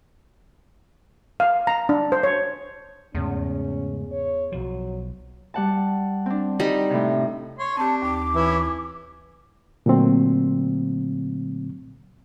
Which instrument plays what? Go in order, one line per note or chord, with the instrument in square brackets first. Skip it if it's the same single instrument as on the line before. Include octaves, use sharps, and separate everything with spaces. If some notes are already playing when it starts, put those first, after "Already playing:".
[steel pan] F5
A#5
D4
C5
C#5
[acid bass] E2 [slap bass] G#2 C#3 A3 [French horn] C#4
[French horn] C#5
[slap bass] B1 F3 [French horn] F#3
[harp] G3 F#5 A5
C4 D4
[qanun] G3 D#4
[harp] A2 C3
[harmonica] C#5 C6
[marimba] C4 G4 [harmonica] D4 [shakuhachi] A5
[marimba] D#2 [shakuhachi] D6
[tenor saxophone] E3 [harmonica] C#4 E4
[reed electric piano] A#2 D3 F#3 A3 C4